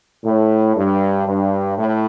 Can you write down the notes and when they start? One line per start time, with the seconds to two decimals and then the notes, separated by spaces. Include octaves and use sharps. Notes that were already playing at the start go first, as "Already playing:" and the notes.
0.24 A2
0.75 G2
1.26 G2
1.76 A2